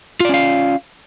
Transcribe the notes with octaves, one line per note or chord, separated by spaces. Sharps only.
C#4 F4 D5 F5